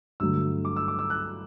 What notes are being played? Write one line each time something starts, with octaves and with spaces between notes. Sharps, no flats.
G2 D3 F#3 A3 E6
D6
E6
D6
E6
F#6